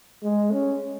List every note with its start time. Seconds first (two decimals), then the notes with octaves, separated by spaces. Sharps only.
0.23 G#3
0.52 C#4